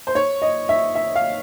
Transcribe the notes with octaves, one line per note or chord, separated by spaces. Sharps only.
C5
C#5
D#5
E5
E5
F5